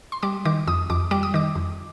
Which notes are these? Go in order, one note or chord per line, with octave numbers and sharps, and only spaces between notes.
C6
G3 D6
D#3 D6
F2 D#6
F2 D6
G3 D6
D#6
D#3 D6
F2